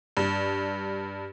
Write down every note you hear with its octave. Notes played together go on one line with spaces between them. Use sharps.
G2